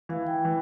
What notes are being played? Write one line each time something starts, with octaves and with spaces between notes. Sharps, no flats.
E3 F5
G5
E3